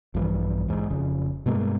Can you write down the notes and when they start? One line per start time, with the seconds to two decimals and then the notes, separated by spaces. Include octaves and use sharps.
0.14 A#1 G2 D3 E3
0.68 E2 G#2
0.90 F1 C#3
1.46 G2 B2 G#3 A#3